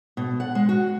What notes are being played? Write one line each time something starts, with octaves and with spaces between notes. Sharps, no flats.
B2
F#5
G#3
F#4